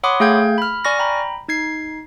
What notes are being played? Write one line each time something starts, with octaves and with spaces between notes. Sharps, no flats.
C#5 F#5 B5 C6 D6 D#6
A3 G#4 F5 G5 G6 G#6
B5 F6
D5 G#5 C#6 F6 A#6
G5 A#5 B5
D#4 G#6 C7